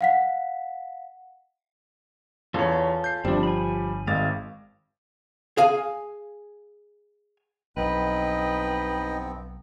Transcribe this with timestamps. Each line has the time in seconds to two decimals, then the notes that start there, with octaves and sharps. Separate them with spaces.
0.01 F5 F#5 B6
2.54 E2 C#4 F4 A4 C#5
3.04 G6 C7
3.25 G1 F3 G3 C4 D4
3.43 G#5 B5
4.07 G#1 G#3 F5 A6
5.58 G#4 F5 G#5
7.77 B1 G2 B3 C4 D#4 B4 D#5 G5